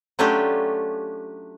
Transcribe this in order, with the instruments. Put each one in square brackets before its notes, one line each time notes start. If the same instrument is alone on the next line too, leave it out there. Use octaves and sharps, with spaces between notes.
[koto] F#3 A3 C#4 D4 F4 G4